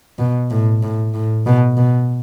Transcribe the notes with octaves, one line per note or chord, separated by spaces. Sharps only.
B2
A2
A2
A2
B2
B2